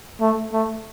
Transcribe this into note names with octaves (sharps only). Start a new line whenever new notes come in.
A3
A3